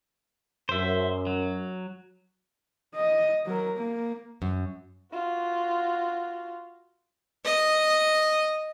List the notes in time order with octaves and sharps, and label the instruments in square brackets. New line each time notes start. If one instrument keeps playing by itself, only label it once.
[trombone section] F#2 [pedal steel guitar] C5 E5
[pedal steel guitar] F#3
[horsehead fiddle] D#5
F#3 A#4
A#3
[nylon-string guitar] F#2
[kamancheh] F4 F#4
[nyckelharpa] D#5